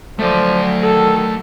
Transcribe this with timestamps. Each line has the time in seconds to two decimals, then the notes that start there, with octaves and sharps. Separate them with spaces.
0.19 F3 F#3 A3 D5
0.82 D#3 A4